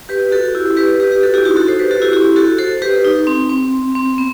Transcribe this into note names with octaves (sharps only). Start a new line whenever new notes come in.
G4 B4
F#4 A4
E4 G4
G4 B4
G4 B4
G4
F#4 A4
E4 G4
D#4 F#4
F#4 A4
A4 C5
G4 B4
F#4 A4
E4 G4
E4 G4
F#4 A4
A4 C5
G4 B4
D#4
C4
C4
C4
B3